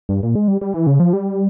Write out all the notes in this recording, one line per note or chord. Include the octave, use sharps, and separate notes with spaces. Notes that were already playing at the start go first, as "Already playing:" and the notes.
G2
A#2
G#3
G3
G3
E3
C#3
F3
G3